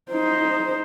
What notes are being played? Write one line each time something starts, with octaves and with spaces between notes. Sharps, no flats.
D#4 C5